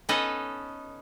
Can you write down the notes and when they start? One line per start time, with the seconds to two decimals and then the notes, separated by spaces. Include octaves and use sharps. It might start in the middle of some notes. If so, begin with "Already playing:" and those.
0.09 B3 C#4 D#4 A4 B4 D#5